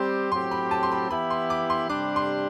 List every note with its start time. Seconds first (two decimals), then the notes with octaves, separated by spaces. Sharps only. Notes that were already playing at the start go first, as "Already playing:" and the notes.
Already playing: G3 C4 G4 C6
0.32 A2 F#3 C4 G4 C6
0.51 B5
0.71 A5
0.83 C6
0.92 B5
1.11 E3 B3 E4 G4 B5
1.30 C6
1.50 D6
1.70 C6
1.89 C3 G3 D4 G4 D6
2.16 C6